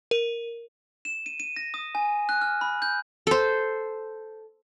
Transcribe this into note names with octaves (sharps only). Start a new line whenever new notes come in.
A#4
E7
D#7
D#7
A#6
D#6
G#5
F#6
F6
B5
G6
A4 C5